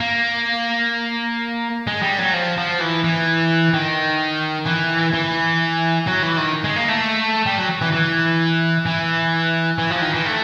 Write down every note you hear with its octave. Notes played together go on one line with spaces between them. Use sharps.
A#3
G#3
G3
F#3
F3
F3
E3
E3
D#3
E3
E3
F#3
E3
D#3
G#3
A#3
A3
G3
F#3
E3
E3
E3
E3
F3
D#3
E3
A3